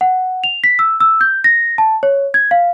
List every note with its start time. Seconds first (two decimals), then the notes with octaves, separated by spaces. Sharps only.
0.01 F#5
0.44 F7
0.64 B6
0.79 E6
1.00 E6
1.21 G6
1.44 A#6
1.78 A5
2.03 C#5
2.34 G#6
2.51 F5